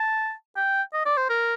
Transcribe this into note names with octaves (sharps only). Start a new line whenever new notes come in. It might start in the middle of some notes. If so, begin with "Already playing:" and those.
Already playing: A5
G5
D#5
D5
C5
A#4